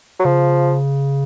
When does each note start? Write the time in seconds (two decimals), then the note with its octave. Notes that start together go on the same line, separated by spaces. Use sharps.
0.20 F#3
0.25 C#3 F3